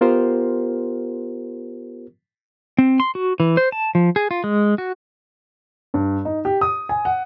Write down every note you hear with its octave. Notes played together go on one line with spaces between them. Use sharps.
B3 F4 G4 A#4 C5
C4
C6
F#4
E3
C5
A5
F3
G#4
F4
G#3
F#4
G2
D#4
G4
D#6
G#5
F#5